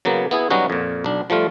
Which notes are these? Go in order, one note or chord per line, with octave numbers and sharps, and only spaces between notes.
C#3 F#3 A#3 B3
B3 E4 G#4
F#3 G3 B3 C#4 D#4 F#4
F2 A#2
B1 D4
F3 G3 A3 F4